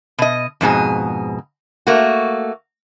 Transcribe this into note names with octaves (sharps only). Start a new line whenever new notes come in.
B2 D#5
F2 G#2 B2 G#4
A3 A#3 F#4